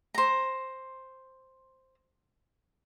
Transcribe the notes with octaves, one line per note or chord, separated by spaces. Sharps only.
C5 A#5